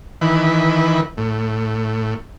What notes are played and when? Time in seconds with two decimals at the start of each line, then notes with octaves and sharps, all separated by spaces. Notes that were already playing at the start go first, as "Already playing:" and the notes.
0.21 D#3 E3 B4
1.17 A2